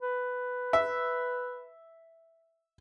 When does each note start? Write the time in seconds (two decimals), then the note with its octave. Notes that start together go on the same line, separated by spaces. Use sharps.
0.02 B4
0.73 E5